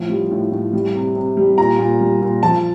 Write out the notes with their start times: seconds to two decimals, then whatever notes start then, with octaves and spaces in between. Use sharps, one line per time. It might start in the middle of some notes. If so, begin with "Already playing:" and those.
Already playing: A2 F3
0.09 G3
0.31 A2
0.52 A2
0.73 G3
0.95 C3
1.16 C3
1.37 G3
1.58 A#2 A#5
1.79 A#2
2.00 G3
2.22 A#2
2.42 F3 A5